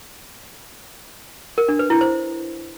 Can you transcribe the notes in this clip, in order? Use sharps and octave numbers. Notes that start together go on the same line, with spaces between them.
A#4
D4
B4
E4
C5